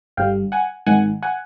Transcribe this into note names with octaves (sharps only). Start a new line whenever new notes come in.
G1 G2 D3 G3 F5 G5
F#5 G#5
G#1 G#2 D#3 F#5 G#5
F#5 G#5